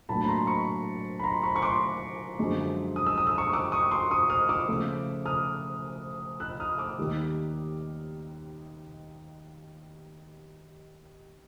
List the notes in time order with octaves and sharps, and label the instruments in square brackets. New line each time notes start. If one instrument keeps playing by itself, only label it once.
[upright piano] A2 F#3 A#3 D4 A5 B5
B5
A#5 C6
B5 C#6
B5
A#5 C6
B5 C#6
C#6
C6 D6
F#2 D3 F3 G#3
D#6
E6
D#6
E6
C#6 D#6
D6 E6
C#6 D#6
C6 D6
C#6 D#6
D#6 F6
D6 E6
C#3 F3 A3
D#6 F6
E6 F#6
D#6 F6
D6 E6
D#2 D#3 G3 A#3 D#4